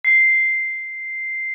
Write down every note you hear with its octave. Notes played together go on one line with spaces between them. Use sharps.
C7